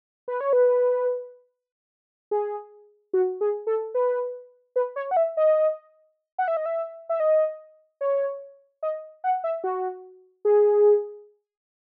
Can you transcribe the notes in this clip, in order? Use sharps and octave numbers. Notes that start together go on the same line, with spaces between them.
B4
C#5
B4
G#4
F#4
G#4
A4
B4
B4
C#5
F#5
E5
D#5
F#5
E5
D#5
E5
E5
D#5
C#5
D#5
F#5
E5
F#4
G#4